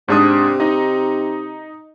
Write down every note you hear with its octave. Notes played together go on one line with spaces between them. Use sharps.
G#2 C3 D4 D#6
D#4 D#5